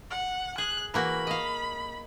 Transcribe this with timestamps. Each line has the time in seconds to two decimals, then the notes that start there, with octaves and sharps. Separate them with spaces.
0.11 F#5
0.58 G#4 F#6
0.94 E3 A#3 F#4 B5
1.27 D#5 F5